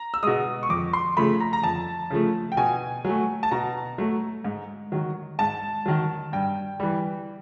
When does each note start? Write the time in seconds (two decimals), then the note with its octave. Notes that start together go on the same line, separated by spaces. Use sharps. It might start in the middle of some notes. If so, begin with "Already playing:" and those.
Already playing: A#5
0.14 E6
0.23 B2 G#3 D#6
0.63 C#6
0.70 F2 D6
0.93 C6
1.17 C#3 F3 A3 B5
1.40 A#5
1.53 A#5
1.63 F2 A5
2.10 C#3 F3 A3
2.52 G5
2.57 B2 G#5
3.05 F#3 A3
3.43 A5
3.51 B2 A#5
3.98 F#3 A3
4.44 G#2
4.92 D#3 F#3
5.39 G#2 A5
5.86 D#3 F#3
6.33 G2 G5
6.80 E3 G3